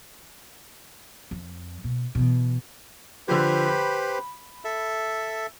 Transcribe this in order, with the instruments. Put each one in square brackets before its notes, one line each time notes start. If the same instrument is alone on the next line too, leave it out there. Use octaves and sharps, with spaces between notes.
[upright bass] F2
B2
B2 E3
[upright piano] D3 F3 [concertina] G4 B4 C5
[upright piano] B5
[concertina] A4 E5